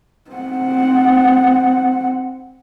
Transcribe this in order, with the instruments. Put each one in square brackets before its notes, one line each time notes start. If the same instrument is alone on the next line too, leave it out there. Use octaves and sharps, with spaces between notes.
[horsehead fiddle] C4 F#5